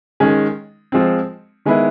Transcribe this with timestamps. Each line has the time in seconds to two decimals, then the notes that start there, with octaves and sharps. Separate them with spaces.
0.20 D#3 G#3 C#4
0.92 F3 G#3 C4
1.66 D#3 G#3 B3 E4